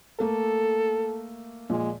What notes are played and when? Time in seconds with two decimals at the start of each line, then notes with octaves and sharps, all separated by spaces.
0.20 A3 A#3 A4
1.70 A#2 F3 G#3